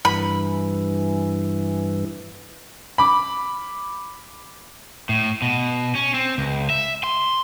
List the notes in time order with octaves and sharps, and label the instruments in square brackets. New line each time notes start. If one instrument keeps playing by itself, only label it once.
[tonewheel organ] G2 E3 [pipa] B5
[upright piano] B5 D6
[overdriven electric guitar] A2
B2
C#4
C4
C#2
E5
C6